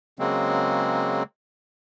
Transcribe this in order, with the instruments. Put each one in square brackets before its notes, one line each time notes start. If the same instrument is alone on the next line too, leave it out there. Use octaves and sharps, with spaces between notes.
[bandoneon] C#3 F#3 G#3 A#3 C4